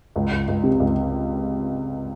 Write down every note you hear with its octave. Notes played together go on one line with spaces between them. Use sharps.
C#2
C#2
C#2
C3
C#2